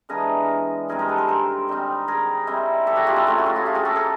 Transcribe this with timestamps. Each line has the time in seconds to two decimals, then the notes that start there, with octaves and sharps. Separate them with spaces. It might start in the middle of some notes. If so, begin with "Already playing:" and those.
0.09 E3 G#3 B3 D4 G#4 A#4
0.89 G2 D#3 G#3 C4 G#4 A#4
0.99 A#4 C5
1.08 A4 B4
1.18 A#4 C5
1.28 A#4 C5
1.68 D#3 G3 C4 D#4
2.08 G#4 A#4
2.47 D#3 G3 C4 E4
2.87 G4 A4
2.96 F#4 G#4
3.07 F4 G4
3.16 E4 F#4
3.27 C#3 F#3 A3 F4
3.38 F#4
3.45 F4 G4
3.55 F#4 G#4
3.66 F4 G4
3.75 F#4 G#4
3.85 G4 A4
3.95 G#4 A#4